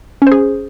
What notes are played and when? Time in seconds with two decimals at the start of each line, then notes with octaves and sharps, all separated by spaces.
0.22 C#4
0.27 C5
0.32 G#4